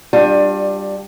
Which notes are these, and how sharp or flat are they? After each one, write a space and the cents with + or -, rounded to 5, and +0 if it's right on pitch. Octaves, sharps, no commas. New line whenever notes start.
G3 +0 D4 +15 F4 +35